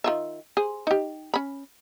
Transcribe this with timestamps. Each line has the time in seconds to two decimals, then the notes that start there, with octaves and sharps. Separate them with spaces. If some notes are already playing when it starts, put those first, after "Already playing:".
0.04 D#3 F4 E5
0.57 G#4 C5
0.87 D#4 G4
1.34 C#4 B5